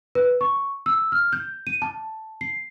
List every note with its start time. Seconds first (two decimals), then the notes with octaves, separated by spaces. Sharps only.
0.15 B4
0.41 C#6
0.86 E6
1.12 F6
1.33 G6
1.67 D#7
1.82 A5
2.41 C7